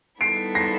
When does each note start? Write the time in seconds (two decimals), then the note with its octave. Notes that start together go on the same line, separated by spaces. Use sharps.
0.21 D#3 G3 B3 E4 A4 C7 D7
0.55 A#6 C7